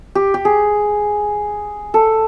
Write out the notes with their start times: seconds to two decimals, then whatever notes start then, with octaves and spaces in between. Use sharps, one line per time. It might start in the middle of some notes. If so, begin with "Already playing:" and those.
0.15 G4
0.34 G4
0.45 G#4
1.94 A4